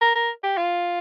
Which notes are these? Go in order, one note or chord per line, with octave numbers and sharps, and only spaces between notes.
A#4
A#4
G4
F4